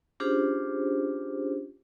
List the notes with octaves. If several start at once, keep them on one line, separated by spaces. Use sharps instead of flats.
C#4 D4 F4 G4 G#4 C5